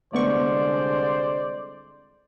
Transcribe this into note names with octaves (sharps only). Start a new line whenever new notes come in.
C2 D3 G#3 A3 B3 C5 D5 C#6